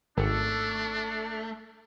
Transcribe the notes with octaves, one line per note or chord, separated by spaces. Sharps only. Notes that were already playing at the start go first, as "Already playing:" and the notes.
G#1 A3 D4